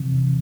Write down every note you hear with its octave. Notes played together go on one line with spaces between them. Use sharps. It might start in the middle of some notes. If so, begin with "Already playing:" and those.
Already playing: C3 E3
E2